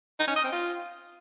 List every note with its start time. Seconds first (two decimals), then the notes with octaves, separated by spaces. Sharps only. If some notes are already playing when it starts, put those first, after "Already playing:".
0.20 D#4
0.28 C#4
0.36 D#5
0.44 C4
0.52 F4